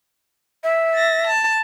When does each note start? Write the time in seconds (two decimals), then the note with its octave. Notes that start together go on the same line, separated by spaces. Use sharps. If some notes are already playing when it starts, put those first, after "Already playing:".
0.64 E5
0.95 A6 A#6
1.27 A5